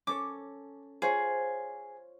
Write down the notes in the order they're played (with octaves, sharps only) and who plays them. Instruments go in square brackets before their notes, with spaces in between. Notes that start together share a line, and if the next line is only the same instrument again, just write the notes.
[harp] C#4 A4 C#5 [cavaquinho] D6
[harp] F4 C5 C#5 [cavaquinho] G#4